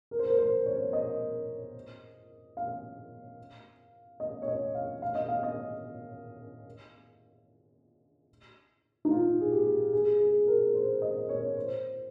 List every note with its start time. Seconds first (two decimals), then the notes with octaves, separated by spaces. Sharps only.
0.11 A#4
0.19 C5
0.26 A#4
0.39 C5
0.66 C#5
0.93 D#5
2.57 F5
4.20 D#5
4.42 C#5
4.48 D#5
4.75 F5
5.02 F5
5.15 D#5
5.28 F5
5.43 D#5
9.05 D#4
9.11 F4
9.41 G#4
9.52 G4
9.93 G#4
10.20 G#4
10.47 A#4
10.75 C5
11.02 D#5
11.29 C#5
11.57 C5